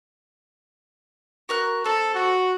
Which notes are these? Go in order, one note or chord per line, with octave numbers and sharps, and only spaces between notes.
F#4 A#4 F#6
C4 A4
F#4